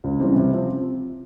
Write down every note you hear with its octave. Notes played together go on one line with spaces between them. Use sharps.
C#2
C#3 E3 G3 C4
C3
F3 C4